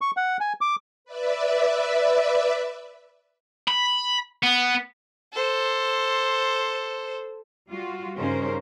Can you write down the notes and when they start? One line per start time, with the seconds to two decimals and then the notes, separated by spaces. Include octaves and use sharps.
0.01 C#6
0.17 F#5
0.40 G#5
0.61 D6
1.05 B4 D5 E5
3.68 B5
4.43 B3
5.33 A4 C5
7.68 G3 F4 F#4
8.17 G2 C#3 C#4 D#4 A#4 C5